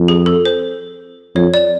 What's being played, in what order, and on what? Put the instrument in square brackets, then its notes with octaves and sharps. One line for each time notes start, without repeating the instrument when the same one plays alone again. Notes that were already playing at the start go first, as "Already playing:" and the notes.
Already playing: [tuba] F2
[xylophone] G#4
A4
C5
[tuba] F2 [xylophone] C#5
[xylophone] D5